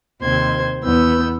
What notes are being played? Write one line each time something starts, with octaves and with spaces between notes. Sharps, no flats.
D#2 C3 C5 C6 G#6
E2 B3 E6 G6